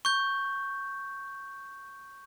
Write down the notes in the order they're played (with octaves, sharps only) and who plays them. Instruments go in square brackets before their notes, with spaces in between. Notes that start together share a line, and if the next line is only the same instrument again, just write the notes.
[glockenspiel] C#6 G6